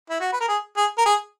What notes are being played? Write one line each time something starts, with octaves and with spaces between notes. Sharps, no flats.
E4
F#4
B4
A#4
G#4
G#4
A#4
G#4